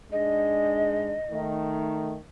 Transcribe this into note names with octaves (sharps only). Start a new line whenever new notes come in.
G#2 G#3 D4 D#5
D#3 A3